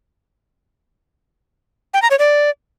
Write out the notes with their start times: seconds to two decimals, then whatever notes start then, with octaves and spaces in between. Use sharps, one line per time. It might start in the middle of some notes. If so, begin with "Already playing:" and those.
1.94 G5
2.02 A#5
2.11 C#5
2.19 D5